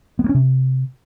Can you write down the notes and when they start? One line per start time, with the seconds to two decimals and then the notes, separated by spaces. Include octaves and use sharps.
0.19 B3
0.24 A#3
0.29 C#4
0.34 C3